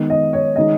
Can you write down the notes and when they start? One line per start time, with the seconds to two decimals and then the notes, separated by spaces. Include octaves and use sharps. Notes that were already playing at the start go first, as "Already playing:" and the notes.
Already playing: D#3 G#3 B3
0.10 D#5
0.33 C#5
0.56 D#3 G#3 D#4 D#5